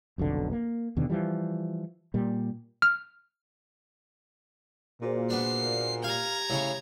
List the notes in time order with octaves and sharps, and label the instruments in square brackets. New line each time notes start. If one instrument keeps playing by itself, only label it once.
[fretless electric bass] F1 B1 F2 D3
A#3
D#2 B2 D3
E3 F3 G3
A#2 G3
[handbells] F6
[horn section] A#2 [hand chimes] F#4 G#4 C5
[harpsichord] B3 D4 [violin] C7
[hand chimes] G4 [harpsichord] F5 [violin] A#5 G#6
[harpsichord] A2 C#3 C#5